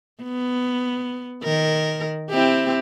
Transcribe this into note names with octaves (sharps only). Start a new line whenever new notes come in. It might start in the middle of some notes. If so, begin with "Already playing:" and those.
B3
D#3 A#4
C4 E4 G4